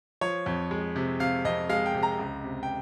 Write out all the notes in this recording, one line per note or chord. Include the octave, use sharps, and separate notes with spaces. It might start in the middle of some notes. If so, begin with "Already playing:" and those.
F3 C#5
F2
G#3
C3
C3 F5
F2 D#5
G#3 F5
G5
C3
A#5
C#2
C3
G5